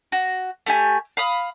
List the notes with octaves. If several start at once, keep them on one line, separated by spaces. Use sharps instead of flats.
F#4
A3 G4 G#5
F5 B5 D#6